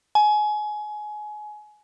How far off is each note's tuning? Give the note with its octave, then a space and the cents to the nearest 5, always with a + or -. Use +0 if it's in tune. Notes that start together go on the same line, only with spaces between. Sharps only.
G#5 +25